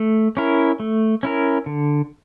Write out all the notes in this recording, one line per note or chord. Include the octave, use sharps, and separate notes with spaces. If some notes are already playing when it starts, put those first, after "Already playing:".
Already playing: A3
C#4 E4 A#4
A3
C#4 E4 A#4
D3